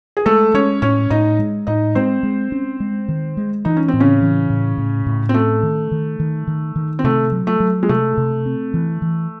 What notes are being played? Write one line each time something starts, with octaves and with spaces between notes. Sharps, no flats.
G#4
G#3 A3 A4
G#3 C#4 C#5
A2 C#4 C#5
A2 D#4 D#5
G#3
A2 D#4 D#5
G#3 C4 C5
G#3
C#4
G#3
D#3
G#3
E3 D#4
C#4
C4
A2
C#3 C#4
E3
A2
A2
A2
C4
A3 C#4
D#3
D#3
D#3
D#3
D#3
C4
C3 A3
F#3
A3
F#3
G#3
C3 A3
C3
C4
E3
E3